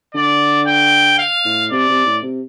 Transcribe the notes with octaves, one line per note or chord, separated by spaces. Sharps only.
D3 D5
G5
F5
A2
C3 D5
C3
A2
C3